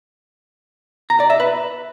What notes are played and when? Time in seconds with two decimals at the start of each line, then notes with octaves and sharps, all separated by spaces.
1.10 A#5
1.20 D5
1.30 E5
1.40 B4